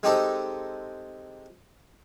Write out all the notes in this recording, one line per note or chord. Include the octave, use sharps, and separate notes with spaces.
G#3 C4 D#4 G4 A4 C5